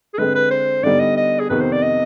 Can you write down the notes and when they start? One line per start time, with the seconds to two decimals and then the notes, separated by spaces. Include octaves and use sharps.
0.14 G#4
0.18 D3 G#3 C4 B4
0.35 B4
0.50 C5
0.83 D3 G3 B3 D#4 D5
1.00 D#5
1.17 D#5
1.40 G#4
1.50 F2 C3 D#3 B3 B4
1.60 C5
1.72 D5
1.82 D#5